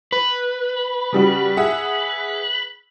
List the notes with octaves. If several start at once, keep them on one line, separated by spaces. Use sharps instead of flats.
B4
C#3 G3 F#4
G#4 E5 F#5